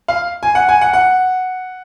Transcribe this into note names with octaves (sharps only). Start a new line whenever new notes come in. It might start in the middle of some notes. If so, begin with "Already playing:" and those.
F5
G#5
F#5
G#5
F#5
F#5